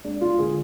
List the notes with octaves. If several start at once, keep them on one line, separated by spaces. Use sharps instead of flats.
G#3 D4
G#3 F4
D3 G#4